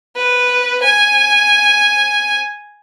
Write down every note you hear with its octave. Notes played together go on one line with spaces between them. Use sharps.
B4
G#5